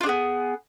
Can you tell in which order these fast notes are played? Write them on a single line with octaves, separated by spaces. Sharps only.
F4 D4 G#4 B3